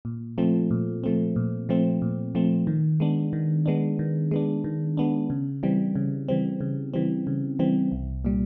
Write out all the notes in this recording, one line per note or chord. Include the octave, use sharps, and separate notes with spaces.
A#2
F3 A3 C4
A#2
F3 A3 C4
A#2
F3 A3 C4
A#2
F3 A3 C4
D#3
G#3 B3 D4
D#3
G#3 B3 D4
D#3
G#3 B3 D4
D#3
G#3 B3 D4
C#3
E3 G3 C4
C#3
E3 G3 C4
C#3
E3 G3 C4
C#3
E3 G3 C4
C2
A#2 G3